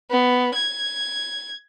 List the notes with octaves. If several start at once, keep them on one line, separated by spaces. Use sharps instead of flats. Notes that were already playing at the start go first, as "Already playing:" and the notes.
B3
G#6